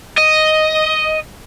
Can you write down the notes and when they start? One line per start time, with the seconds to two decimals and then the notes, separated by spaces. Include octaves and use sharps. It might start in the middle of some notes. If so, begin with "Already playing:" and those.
0.18 D#5